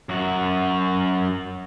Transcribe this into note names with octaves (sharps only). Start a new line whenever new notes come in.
F#2 F#4